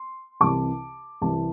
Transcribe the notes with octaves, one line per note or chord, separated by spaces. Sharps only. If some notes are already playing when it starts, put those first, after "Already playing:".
Already playing: C6
C2 C3 E3 A5 D6
C2 C3 E3 A5